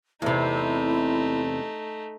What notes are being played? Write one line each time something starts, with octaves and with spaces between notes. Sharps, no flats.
E2 C3 A3 D#4 E4